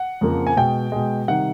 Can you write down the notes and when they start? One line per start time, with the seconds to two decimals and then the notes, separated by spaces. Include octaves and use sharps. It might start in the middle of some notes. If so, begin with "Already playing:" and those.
Already playing: F#5
0.21 F2 C#3 F3 A#3
0.47 G#5
0.57 B2 G#3 G5
0.92 B2 G#3
1.28 C3 D#3 G3 F#5